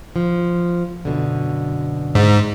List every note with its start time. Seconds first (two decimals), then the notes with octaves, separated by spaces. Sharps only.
0.16 F3
1.05 F#2 B2 D3
2.15 G#2